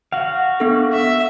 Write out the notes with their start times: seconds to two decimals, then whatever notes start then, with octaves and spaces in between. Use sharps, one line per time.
0.12 F#4 F5 F#5
0.60 B3 D4 A4
0.94 E5